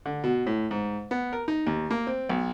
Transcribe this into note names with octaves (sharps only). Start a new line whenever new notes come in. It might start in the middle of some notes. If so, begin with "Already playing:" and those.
D3
B2
A2
G#2
B3
A#4
D#4
D#2
A#3
C4
B1